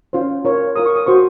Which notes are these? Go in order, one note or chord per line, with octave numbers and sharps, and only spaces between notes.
C#4 F4 C5
F4 A#4 C#5
F4 A#4 C#5 D#6
C#6
D#6
F#4 C5 C#6